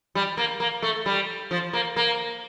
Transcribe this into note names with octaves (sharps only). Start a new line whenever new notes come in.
G3
A#3
A#3
A3
G3
F3
A#3
A#3